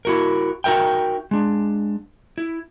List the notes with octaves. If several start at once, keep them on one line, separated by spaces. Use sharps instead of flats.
E4 F#4 A#4
D#4 F#4 A#4 E5 G5
G#3 D4
E4